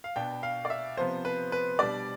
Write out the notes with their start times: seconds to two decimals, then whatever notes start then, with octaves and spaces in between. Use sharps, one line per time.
0.04 F5
0.16 B2 B3 D4 G5
0.43 F5
0.65 D5
0.70 E5
0.97 C3 F3 B3 C5
1.25 B4
1.52 B4
1.79 B2 G3 D4 D5